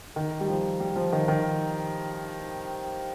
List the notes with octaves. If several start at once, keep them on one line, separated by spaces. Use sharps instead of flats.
D#3
G3
F3
G3
F3
D#3
D#3